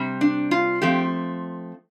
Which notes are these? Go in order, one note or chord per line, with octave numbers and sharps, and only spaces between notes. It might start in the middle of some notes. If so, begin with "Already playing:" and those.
Already playing: C3 G3
D4
F4
F3 A3 C4 G4